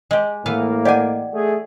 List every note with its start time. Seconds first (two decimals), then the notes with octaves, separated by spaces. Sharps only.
0.11 G#3 G4
0.46 A2 E3 A#3 B3 F5
0.85 G4 D5 D#5 F#5 G#5
1.34 A3 G#4